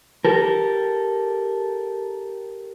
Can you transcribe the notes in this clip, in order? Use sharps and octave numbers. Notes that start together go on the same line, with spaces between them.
G4 A4 A#4